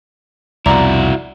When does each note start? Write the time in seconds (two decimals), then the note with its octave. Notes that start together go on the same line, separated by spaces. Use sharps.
0.66 C2 F2 B2 E4 F#4 D5 A#5 D6